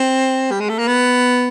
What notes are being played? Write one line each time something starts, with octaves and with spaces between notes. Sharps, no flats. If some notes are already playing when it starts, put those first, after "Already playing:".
Already playing: C4
G3
G#3
A3
A#3
B3